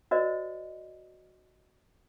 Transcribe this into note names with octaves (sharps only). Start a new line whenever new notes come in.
F#4 A#4 C5 D5 D#5